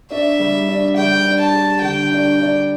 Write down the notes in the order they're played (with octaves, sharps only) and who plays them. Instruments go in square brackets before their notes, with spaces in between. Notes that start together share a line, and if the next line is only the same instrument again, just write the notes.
[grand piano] D4 [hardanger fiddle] E5
[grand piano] G3
D4
[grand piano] G3 [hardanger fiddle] G5
[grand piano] D4
[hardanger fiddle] A5
[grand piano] G4
[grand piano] D3 [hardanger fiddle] G5
[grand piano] D4
D4